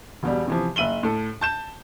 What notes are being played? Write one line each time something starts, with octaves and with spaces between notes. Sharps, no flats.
E1 B2 G3
C3 E3 F3
F#1 E5 D#7 F#7 G7
A2 A4
A5 G6 E7